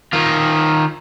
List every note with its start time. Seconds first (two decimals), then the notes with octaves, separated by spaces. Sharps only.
0.13 D#3 F4